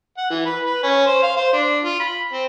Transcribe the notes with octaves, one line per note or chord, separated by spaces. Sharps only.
F#5
E3
B4
B4
C#4
C5
F5
C5
D4
F4
B5
C4